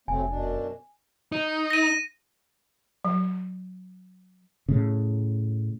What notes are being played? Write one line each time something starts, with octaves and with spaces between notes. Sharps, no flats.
F1 F#3 A3 C4 G#5
F#2 B2 D4
D#4
A#6 D#7
F#3
A2 C#3